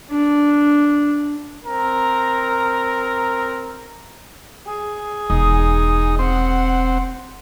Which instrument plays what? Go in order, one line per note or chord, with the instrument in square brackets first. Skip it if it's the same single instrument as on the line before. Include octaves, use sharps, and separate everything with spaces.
[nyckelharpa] D4
[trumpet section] C4 A#4 A#5
[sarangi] G#4
[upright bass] E1 [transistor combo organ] D#4
[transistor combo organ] C4 [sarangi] F#5